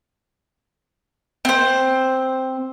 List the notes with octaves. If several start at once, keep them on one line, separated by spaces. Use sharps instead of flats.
C4 C5